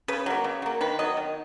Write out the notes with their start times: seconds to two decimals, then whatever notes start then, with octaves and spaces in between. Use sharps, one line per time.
0.08 C#3 B4
0.26 F#3 A#3
0.44 C#3
0.62 F#3 A#3
0.81 D#3 B4
0.99 F#3 B3 D#5
1.17 D#3